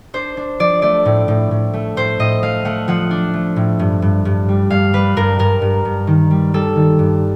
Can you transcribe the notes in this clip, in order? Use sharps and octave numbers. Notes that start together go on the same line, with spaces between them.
D4 C5
D4
F3 D5
A3 D5
A2
A2
A2
A3
A2 C5
A2 D#5
A3 F5
A3 F#5
F3 F#5
D4
A3
A2
G2
G2
G2
G3
G2 F5
G3 B4
G2 A#4
G2 A#4
G2
G2
D#3
G3
G3 A4
D#3
G2